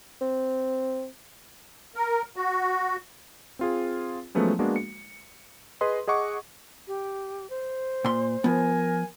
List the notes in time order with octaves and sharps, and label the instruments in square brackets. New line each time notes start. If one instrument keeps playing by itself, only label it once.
[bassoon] C4
[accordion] A#4
F#4
[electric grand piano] C4 F4 G#4
F3 F#3 G#3 A3 B3 C#4
G#3 A#3 B3 D4 F#4
C#7
G#4 B4 D#5 C6
G#4 D#5 F#5 C#6 D6
[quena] G4
C5
[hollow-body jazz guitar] A#2 C6
[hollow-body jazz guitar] F3 B3 [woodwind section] A#4 G#5